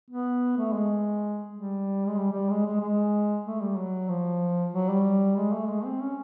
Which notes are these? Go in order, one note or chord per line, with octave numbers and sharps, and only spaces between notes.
B3
A3
G#3
G3
G#3
G3
G3
G#3
G#3
G#3
A3
G3
F#3
F3
F#3
G3
G#3
A3
G#3
C4
C#4